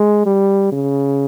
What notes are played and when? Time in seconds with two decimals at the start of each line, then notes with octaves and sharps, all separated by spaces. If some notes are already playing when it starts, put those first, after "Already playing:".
Already playing: G#3
0.26 G3
0.72 C#3